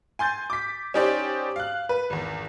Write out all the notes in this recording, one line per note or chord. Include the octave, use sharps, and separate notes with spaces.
G#5 C6 G6 A6
D6 B6
C#4 D#4 G4 C5 D5
F5 F#6
B4
G#1 E2